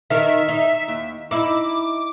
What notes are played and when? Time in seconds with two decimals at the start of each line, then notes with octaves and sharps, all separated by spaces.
0.10 D#3 D#4 A#4 E5
0.49 D#4
0.88 D#2
1.31 D#4 E4 D6